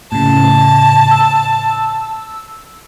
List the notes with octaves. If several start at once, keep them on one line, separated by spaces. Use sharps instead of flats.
A2 C#3 A5
E6